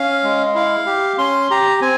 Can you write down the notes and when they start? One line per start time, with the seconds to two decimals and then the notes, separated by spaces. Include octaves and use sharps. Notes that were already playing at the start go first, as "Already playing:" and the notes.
Already playing: C#4 F5
0.24 G#3
0.55 E4 F5
0.86 G4
1.18 C#4 C6
1.50 G4 A#5
1.81 C4 G#5